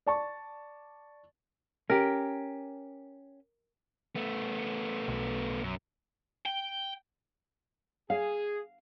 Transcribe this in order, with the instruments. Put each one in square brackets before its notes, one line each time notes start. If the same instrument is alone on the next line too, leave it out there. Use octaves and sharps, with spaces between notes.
[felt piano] D5 A5 C#6
[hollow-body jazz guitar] C#4 G4 [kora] A#4
[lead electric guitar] A3 B3
[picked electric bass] B1
[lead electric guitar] F#2
[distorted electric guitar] G5
[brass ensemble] G#4 [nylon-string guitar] F5